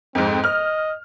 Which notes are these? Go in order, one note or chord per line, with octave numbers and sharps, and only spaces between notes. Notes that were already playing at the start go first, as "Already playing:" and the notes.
F2 G#2 C4
D#5 F6